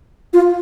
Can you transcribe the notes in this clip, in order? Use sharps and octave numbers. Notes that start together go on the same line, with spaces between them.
F4